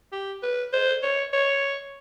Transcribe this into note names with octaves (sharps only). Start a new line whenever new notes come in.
G4
B4
C5
C#5
C#5